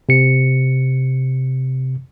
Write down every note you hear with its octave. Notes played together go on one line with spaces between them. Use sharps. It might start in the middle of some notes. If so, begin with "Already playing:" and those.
C3 C#7